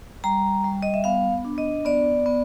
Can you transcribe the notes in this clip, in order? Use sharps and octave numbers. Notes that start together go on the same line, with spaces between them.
G3 A#5
G3
D#5
E5
B3 F5
D4
D#5
B3 D5
B3